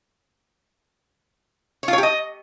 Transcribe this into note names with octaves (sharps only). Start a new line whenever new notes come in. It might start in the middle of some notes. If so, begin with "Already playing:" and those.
C#5
F4
C#5
G4
D#5